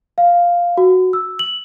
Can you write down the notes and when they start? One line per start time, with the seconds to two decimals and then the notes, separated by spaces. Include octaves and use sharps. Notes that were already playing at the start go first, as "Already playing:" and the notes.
0.18 F5
0.78 F#4
1.13 E6
1.39 F#7